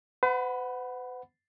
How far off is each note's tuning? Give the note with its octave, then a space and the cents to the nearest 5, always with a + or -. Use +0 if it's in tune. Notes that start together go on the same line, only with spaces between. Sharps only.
B4 +45 F#5 +0 B5 +0